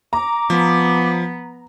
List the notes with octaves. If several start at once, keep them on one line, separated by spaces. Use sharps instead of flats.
A#5 D6
F3 B3